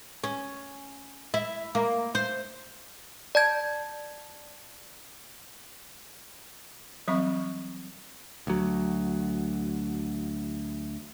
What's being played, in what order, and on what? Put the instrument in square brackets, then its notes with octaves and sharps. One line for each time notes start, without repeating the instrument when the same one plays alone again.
[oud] C#4
E4
A#3
C5
[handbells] D5 A5 G#6
[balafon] E3 F#3 G3 C4 B5 C#6
[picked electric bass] D2 F#3